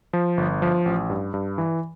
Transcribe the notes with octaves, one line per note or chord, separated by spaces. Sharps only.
F3
G1
F3
A1
G2
G2
E3